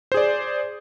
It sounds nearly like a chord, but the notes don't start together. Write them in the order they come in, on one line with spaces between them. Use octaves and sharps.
C5 G#4 D5